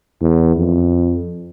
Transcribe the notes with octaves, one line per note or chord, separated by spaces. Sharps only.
E2
F2